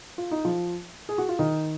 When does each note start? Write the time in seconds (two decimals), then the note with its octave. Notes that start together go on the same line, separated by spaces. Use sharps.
0.18 F4
0.31 D#4
0.45 F3 F4
1.09 G#4
1.18 F#4
1.29 F4
1.39 D#3 D#4